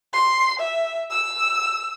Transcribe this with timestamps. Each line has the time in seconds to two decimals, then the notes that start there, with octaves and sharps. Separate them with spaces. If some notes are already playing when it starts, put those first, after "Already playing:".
0.13 C6
0.59 E5
1.10 E6